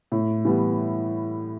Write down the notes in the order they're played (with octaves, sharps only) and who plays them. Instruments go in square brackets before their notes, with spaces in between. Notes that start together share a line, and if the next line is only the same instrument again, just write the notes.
[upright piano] A2
E3 G3 B3